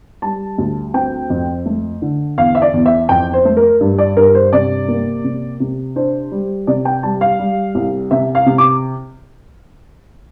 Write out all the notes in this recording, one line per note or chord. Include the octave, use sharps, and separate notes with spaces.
G3 A5
D2
C4 G5
F2
A3
D3
E2 F5
E5
D5
E2
E5
F2 G5
C5
A3
A#4
G2
D5
G2 A#4
C5
C3 D5
A#3
C3
C3
D4 C5
G3
C3 D5
G5
G3 A5
F5
G3
C2
C3 E5
F5
C3
D6